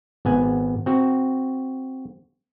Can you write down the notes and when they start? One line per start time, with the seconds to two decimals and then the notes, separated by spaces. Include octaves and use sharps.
0.25 G#1 B3 G#5
0.86 C4 F#4